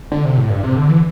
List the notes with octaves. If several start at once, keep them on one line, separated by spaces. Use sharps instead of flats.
D3
C3
A2
G2
C3
D3
E3